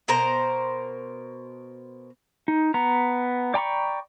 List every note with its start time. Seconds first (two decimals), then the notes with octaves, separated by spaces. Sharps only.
0.08 B2 A#4 C5 A#5
2.48 D#4
2.74 B3 A#5
3.54 D5 G5 A#5 B5 C#6